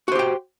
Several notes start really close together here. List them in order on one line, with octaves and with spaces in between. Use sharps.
F#4 C5 G4 G5